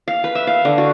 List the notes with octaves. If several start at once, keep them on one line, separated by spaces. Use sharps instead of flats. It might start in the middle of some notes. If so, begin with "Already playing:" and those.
F5
B4
E5
F5
D3
F#4